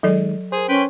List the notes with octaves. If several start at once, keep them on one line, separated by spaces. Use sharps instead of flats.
D#3 F#3 G#3 A4 D5
G#4 A#4 C5
C#4 B4 G5 C6